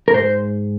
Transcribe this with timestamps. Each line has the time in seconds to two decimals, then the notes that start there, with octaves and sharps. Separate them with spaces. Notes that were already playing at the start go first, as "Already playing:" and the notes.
0.08 A#4
0.14 G#2 C5